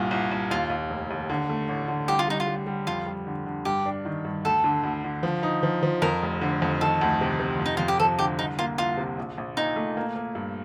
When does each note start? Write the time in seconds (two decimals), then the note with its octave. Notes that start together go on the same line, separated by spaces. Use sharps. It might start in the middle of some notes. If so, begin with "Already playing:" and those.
Already playing: C2 G2 A#2
0.11 C2
0.31 C2
0.51 D#2 F4
0.70 D#2
0.90 F1
1.10 D#2
1.30 D3
1.49 A3
1.69 A1
1.88 D3
2.08 C2 G4
2.19 F4
2.28 G3 D#4
2.40 F4
2.48 G3
2.67 G3
2.87 F2 F4
3.07 G3
3.27 D3
3.46 D3
3.65 G2 G4
3.86 D4
4.05 D#3
4.25 G2
4.45 D2 A4
4.64 D3
4.84 D2
5.04 D3
5.23 F3
5.43 D#4
5.63 F3
5.83 F3
6.02 F2 A#4
6.22 F1
6.41 D3
6.62 F2
6.81 D#3 A4
7.01 D2
7.21 C3
7.40 C3
7.60 F2
7.66 D#4
7.77 F2 F4
7.88 G4
7.99 F3 A4
8.19 D3 G4
8.39 C2 D#4
8.59 A#3 F4
8.78 C2 F4
8.97 C3
9.18 A#1
9.38 A#1
9.57 A#2 D#4
9.76 A3
9.97 A#3
10.16 A#3
10.35 G2